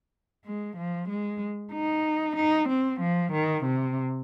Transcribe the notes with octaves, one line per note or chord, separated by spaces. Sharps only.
G#3
F3
G#3
D#4
D#4
C4
F3
D#3
C3